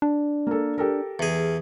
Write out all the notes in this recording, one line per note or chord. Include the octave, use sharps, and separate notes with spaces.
D4
A#3 A4
G4 A4 A#4
E2 G#4